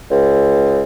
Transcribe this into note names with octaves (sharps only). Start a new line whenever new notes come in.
C#2